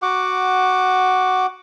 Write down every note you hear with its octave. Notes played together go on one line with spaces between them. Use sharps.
F#4 F#5 D6